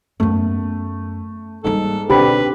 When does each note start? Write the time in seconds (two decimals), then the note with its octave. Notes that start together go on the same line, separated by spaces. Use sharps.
0.20 F#2 A3 B3
1.64 G#2 G3 A#3 A4
2.10 B2 D3 C4 G4 B4 B5